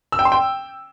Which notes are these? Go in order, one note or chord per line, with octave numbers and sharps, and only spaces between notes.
E6
G5
C6
G5